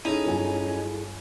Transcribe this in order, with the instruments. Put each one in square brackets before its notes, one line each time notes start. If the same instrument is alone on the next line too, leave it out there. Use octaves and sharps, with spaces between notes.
[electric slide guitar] C#4 [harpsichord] D#4 [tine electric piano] E4 G#4 A4
[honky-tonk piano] G1 F#3 G#5